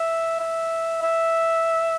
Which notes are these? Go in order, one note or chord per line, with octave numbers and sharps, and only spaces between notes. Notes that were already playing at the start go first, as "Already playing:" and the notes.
Already playing: E5
E5
E5